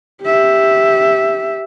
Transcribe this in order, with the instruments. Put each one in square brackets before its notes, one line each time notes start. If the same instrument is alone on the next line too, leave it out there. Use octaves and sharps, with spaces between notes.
[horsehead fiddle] G4 E5